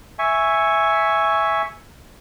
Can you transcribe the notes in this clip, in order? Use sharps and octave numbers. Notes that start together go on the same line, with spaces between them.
E5 G#5 C#6